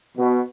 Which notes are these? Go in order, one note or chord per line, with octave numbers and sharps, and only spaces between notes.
B2